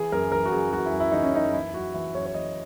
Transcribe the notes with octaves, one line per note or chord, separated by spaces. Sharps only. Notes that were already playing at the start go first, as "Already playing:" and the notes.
Already playing: E3 G#4
F#2 A#4
E3 A#4
F#4
F#2 G#4
E3 F#4
E4
F#2
E4
E3 D#4
C#4
F#2 D#4
E3 E4
F#2 F#4
E3 E4
F#2 C#5
C#5
E3 D#5